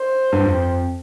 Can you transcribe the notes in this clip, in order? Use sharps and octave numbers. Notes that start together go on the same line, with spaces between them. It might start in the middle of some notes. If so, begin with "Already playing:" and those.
Already playing: C5
G2
F2